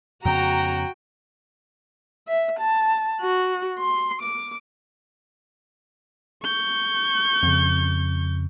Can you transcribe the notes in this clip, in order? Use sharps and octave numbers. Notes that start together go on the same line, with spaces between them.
F2 C#3 B3 F#4 G5 A#5
E5
A5
F#4
C6
D6
C#6 G6
F2 C#3